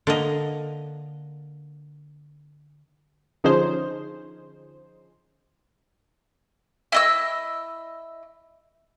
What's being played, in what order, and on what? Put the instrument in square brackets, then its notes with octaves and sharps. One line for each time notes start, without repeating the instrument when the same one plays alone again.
[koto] D3 A#3 D#5
[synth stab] D3 F3 C#4 D#4 G#4 C5
[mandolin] E4 D#5 E6